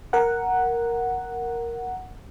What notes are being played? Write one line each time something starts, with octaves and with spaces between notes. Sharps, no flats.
A#4 F#5